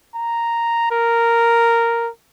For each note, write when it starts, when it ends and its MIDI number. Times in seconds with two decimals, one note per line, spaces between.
0.15 0.90 82
0.91 2.09 70